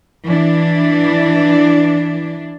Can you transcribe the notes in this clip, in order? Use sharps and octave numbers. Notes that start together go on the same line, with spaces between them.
E3 D4